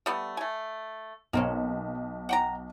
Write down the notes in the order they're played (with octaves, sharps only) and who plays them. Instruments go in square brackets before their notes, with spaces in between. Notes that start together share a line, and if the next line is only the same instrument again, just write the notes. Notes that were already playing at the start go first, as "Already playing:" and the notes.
[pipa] G3 A3 B3
A3 G#5
[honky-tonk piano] B1 [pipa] A#3 C4 C#4
[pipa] F#5 G5 A#5